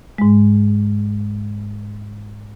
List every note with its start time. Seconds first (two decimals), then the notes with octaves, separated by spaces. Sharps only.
0.18 G#2 G#3